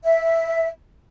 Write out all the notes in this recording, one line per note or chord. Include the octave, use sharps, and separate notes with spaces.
E5